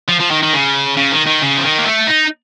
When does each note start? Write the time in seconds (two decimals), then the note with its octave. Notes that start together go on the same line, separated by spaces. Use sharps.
0.09 F3
0.20 F3
0.31 D#3
0.43 D#3
0.53 C#3
0.97 C#3
1.12 D#3
1.27 D#3
1.42 C#3
1.57 F3
1.64 D#3
1.78 A#3
1.85 A3
2.07 D#4